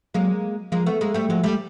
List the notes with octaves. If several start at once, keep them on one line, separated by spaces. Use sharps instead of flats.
F#3 G#3 A#3
F3 G#3 A#3
A3 B3
G#3 A#3
G3 A3
F3 F#3 G#3
G3 A3